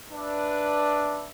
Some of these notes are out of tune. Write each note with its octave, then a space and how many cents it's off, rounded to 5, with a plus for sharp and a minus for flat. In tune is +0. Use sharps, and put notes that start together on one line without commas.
D4 +0 B4 -5 E5 +0